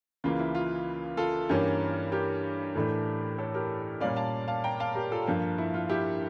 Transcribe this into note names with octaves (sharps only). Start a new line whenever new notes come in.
C#2 C#3 E3 A#3 F4
E4
F4
F4 A4
G2 E3 A#3 C#4 G4 A#4
G4 A#4
A2 E3 A3 D4
A4 C#5
G4 A#4
A#2 G3 A#3 C#4 D5 F5
F5 A5
F5 A5
G5 A#5
F5 A5
G4 A#4
F4 A4
G2 F3 A#3
E4
F4
E4 G4